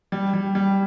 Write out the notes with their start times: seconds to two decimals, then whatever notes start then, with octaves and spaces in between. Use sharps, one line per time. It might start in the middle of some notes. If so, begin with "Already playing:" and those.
0.12 G3
0.34 G3
0.55 G3